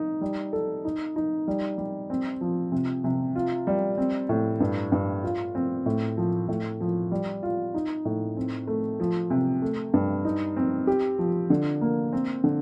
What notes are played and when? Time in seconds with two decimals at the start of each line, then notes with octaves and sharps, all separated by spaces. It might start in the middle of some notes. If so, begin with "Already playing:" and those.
Already playing: D#4
0.21 G3
0.53 A4
0.85 D#4
1.16 D#4
1.48 G3
1.78 G3
2.10 C4
2.41 F3
2.72 C3
3.04 C3
3.36 F4
3.67 G3
3.98 C4
4.29 A2
4.60 G2
4.92 G2
5.23 F4
5.55 C4
5.86 A2
6.17 F3
6.48 A2
6.80 F3
7.12 G3
7.43 F4
7.74 D#4
8.05 A2
8.37 C4
8.67 A3
9.00 F3
9.30 C3
9.62 A3
9.94 G2
10.25 D#4
10.57 C4
10.87 G4
11.19 F3
11.50 D3
11.81 A#3
12.13 C4
12.44 D3